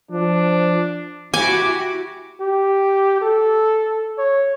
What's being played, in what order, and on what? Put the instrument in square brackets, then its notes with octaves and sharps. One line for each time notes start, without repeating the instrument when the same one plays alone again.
[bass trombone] F3 [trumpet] D4
[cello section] E4 F#4 G4 [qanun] G#5 [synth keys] D6
[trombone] G4
A4
C#5